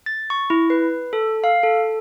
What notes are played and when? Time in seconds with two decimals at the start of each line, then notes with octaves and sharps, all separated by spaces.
0.06 A6
0.30 C#6
0.50 E4
0.70 B4
1.13 A4
1.44 F5
1.63 A4